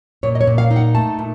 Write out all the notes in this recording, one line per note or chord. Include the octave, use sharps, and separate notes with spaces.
A#2 C#5
D#5
C#5
A#2
F5
D#4
F#5
A3 A5
A#2